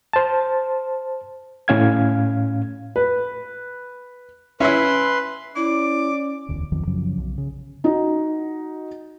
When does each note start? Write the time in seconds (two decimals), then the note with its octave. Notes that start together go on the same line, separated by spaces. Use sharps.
0.13 C5 A5
1.68 A2 C#4 F5 G#6
2.96 B4
4.60 C#4 E4 B4 E5 C6
5.56 C#4 E4 D5 D6
6.49 E1 D2 D3
6.72 B1 F2 D#3 F3
6.87 F#2 C#3 F3 F#3
7.18 B1
7.38 C#3
7.84 D#4 F#4 D#5